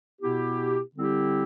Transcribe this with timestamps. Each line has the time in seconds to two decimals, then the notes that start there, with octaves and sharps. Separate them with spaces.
0.20 B2 B3 E4 G4
0.95 D3 G3 C4 E4 G4